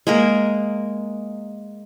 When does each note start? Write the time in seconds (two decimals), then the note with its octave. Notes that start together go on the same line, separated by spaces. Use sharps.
0.07 G#3 A#3 A#4